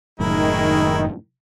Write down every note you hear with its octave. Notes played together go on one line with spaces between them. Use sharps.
F#1 F#2 A2 D#3 G#3 E4 A#4